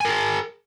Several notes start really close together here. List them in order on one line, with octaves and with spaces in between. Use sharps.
G#5 A#4 G#4